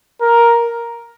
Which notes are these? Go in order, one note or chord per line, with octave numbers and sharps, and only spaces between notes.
A#4